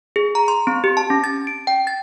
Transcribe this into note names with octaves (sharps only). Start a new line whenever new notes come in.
G#4
A#5
C6
C4
G4
A5
C#4
A6
D7
G5
A6